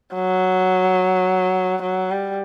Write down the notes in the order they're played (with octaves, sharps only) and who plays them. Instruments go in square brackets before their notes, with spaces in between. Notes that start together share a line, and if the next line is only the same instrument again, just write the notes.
[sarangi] F#3
F#3
G3